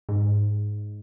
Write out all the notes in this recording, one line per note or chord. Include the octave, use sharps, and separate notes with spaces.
G#2